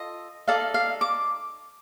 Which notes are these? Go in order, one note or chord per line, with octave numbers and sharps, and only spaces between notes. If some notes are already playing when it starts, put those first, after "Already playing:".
Already playing: F4 A4 D#5
D#4 A4 D5 F5
F5
D6